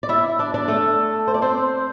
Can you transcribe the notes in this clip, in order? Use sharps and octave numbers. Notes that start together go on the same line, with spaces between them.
D5
E4 E5
D4 D5
D4 D5
A3 A4
C5
D5
C4 C5